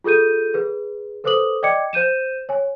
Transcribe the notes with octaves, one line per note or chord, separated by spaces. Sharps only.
F4 G#4 A4 G6 D#7
G#4 B4
A4 B4 C5 D6 D#6 F#7
D5 D#5 G5 D6 G#6 C#7
C5 G6 D#7 E7
C#5 G#5